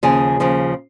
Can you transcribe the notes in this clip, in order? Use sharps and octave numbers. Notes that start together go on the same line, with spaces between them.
D#2 C#3 F3 G#4
D#2 C#3 F3